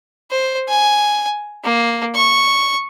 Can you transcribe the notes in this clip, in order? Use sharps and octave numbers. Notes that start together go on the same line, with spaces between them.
C5
G#5
A#3
C#6